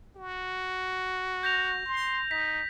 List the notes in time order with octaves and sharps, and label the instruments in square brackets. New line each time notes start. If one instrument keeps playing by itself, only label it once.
[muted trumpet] F#4
[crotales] G6 A#6 F7
[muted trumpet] C6
[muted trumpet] D#4 [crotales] B6